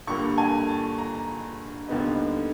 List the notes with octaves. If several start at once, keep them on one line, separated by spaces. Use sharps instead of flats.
G2 D3 G3 A#3 C#6
G#5
A5
A#5
D#2 D3 G3 B3 D#4